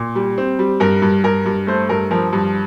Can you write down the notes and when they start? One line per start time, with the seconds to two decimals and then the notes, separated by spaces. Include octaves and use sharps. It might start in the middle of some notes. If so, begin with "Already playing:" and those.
Already playing: A#2
0.15 G3
0.38 C4
0.59 G3
0.80 G2 A#4
1.02 G2
1.24 G2 A#4
1.46 G2
1.67 A3 C5
1.89 G2 A#4
2.11 F3 A#4
2.33 G2